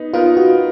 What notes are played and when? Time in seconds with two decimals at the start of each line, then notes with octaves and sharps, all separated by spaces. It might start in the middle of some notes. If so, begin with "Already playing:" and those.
Already playing: B3 D#4
0.14 B3 D#4 F4 A#4
0.37 F#4